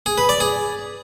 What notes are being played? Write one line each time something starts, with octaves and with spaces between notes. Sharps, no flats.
G#4
B4
D5
G#4